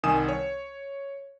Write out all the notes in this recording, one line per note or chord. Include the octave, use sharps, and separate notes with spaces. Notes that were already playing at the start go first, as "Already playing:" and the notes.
C2 D#3 G#5 D#6 E7
C#5